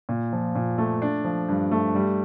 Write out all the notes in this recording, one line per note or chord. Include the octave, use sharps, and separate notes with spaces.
A#2
F3
A#2
A3
D4
F3
G2
A3
G3